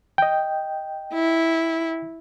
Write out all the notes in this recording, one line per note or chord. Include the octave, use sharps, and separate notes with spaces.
D#5 G5
E4